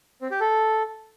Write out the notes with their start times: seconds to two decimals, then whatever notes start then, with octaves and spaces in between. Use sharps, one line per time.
0.21 C4
0.31 G4
0.40 A4